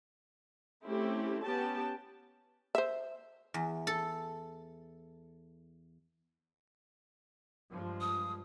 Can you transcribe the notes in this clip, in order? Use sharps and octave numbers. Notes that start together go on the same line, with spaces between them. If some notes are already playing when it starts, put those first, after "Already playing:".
A3 C4 C#4 E4 G4
B3 C#4 G4 G5 A5
C5 E5
E2
A4
G2 F3 G#3
D#6